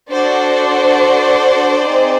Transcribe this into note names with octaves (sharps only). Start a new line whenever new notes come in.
D4 F#4 A4 C5 D5
C4 D#4 G#4